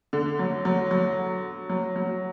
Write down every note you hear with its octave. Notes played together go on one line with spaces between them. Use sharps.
D3
F#3
F#3
F#3
F#3
F#3